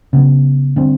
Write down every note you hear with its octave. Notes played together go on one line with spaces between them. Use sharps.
C#3 F#3 B3
D3 G3 C4